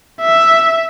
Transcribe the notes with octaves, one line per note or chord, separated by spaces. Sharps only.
E5